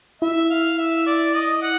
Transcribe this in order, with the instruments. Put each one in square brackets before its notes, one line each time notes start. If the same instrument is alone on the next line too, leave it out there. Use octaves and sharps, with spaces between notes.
[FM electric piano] E4 [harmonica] E5
[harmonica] F5
E5
D5
D#5
F#5